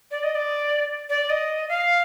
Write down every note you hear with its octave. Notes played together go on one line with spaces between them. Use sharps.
D5
D#5
D5
D5
D#5
F5